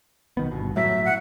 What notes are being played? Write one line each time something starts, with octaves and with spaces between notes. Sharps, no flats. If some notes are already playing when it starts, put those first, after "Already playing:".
B1 D#3 B3
G1 B2
A2 F#3 E5
F#5